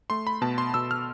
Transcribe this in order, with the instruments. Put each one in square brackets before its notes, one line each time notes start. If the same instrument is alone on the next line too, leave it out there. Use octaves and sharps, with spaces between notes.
[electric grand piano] A3 C6
B5
B2 A5
C6
B2 E6
F6